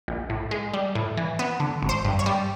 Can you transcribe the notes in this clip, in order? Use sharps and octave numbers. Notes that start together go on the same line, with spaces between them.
A#1
A2
G#3
G3
A2
E3
B3
D3
G#1
C5
G2
C#5
G3